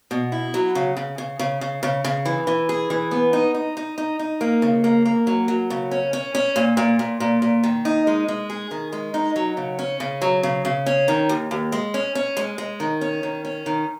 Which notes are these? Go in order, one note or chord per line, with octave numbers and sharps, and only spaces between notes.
B2
E4
F#3
C#3
C#3
C#3
C#3
C#3
C#3
C#3
E3
E3
G#4
E3
B3
D#4
D#4
D#4
D#4
D#4
A#3
C#3
A#3
A#3
F#3
F#3
C#3
C#4
C#4
C#4
A#2
A#2
A#2
A#2
A#2
D#3
D#4
G#3
G#3
G#4
D#3
G#3
D#4
F#3
C#3
C#4
C#3
F#3
C#3
C#3
C#4
D#3
D#2
D#2
G#3
C#4
C#4
G#3
G#3
D#3
C#4
D#3
C#4
D#3